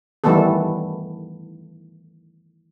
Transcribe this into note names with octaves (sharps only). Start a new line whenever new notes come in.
D#3 E3 G3 A3 B3 A4